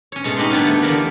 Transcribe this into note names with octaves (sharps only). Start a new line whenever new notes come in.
C#4 C#5
B2 G#3 A3
C#4 D#4 F#4 G4 F#5 C6
D3 G3 A3 B3 C#4
A3 C5
E2 A3 A#3 A#4 B5